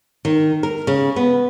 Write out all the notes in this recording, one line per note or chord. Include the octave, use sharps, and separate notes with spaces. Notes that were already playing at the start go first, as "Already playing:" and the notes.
D#3
A#4
C#3
B3